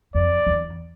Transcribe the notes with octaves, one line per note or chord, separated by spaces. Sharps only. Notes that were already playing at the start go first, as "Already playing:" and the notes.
F2 D5
E2